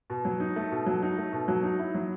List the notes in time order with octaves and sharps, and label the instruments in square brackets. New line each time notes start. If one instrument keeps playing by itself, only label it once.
[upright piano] B2
F#3
D#4
A3
B2
F#3
D#4
A3
B2
F#3
D#4
E4
F#3